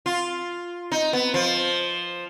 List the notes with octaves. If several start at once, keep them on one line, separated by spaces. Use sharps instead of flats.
F4
D#4
B3
F3